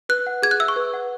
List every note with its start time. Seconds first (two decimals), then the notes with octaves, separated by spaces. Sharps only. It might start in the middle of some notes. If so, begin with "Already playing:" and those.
0.09 B4 F#6
0.27 F#5
0.42 G#4 G#6
0.51 F#6
0.60 E5 E6
0.68 C#6
0.76 B4
0.93 F#5